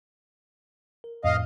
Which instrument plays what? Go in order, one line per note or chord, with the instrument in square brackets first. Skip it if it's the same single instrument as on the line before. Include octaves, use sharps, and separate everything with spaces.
[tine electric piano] A#4
[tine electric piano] F2 A2 [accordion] D#5 F5